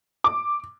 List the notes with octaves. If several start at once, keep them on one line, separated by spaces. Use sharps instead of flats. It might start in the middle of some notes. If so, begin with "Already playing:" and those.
D6